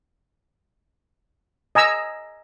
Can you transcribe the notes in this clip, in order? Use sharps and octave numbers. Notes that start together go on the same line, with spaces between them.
D#5 G#5 A#5 E6